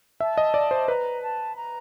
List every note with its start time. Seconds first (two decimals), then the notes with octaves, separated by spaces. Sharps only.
0.20 E5 A5
0.38 D#5
0.54 D5
0.71 C5
0.88 B4 A#5
1.22 A5
1.55 A#5